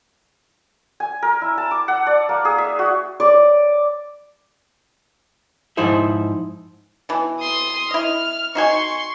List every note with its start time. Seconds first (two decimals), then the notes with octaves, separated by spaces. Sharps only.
1.00 G#5
1.22 A#4
1.42 E4
1.58 A5
1.71 D6
1.88 F#5
2.07 D5
2.29 A#3
2.45 G#4
2.58 E5
2.79 F#4
3.20 D5
5.77 G#2 F3 D#4 E4 C5 E5
7.09 B2 E3
7.40 C6 D#6
7.91 E4 D#5 F6
8.55 D#4 F#4 G#5 C6 C#6